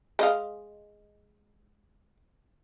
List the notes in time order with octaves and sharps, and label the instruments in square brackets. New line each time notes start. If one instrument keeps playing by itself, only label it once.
[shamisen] G#3 D#5 F5